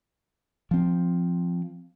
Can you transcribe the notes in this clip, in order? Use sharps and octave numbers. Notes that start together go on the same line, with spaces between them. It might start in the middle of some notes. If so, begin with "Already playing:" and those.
F3 C4